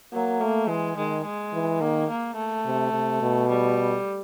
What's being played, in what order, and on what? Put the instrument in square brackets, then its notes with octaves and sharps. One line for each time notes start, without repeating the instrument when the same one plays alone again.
[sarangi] F#3 [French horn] A#3
[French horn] A3 [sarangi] A#3
[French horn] E3 [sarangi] G#3
[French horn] D#3 [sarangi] G#3
[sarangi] G#3
[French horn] E3
[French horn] D#3 [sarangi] A#3
[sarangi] A#3
A3
[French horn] C3
C3
B2
[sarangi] G3